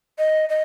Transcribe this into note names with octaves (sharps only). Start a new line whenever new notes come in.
D#5
D#5